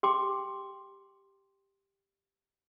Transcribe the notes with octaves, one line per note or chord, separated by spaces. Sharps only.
G4 G5 C6 D6